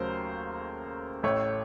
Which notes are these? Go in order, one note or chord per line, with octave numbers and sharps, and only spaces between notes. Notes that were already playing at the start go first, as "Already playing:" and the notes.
Already playing: D#2 C#3 F#3 A3 A#4 C5
A1 A2 A3 C#5